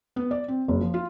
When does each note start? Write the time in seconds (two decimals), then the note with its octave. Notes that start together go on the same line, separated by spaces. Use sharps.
0.16 B3
0.31 D5
0.48 C4
0.68 F#1
0.81 F3
0.94 F4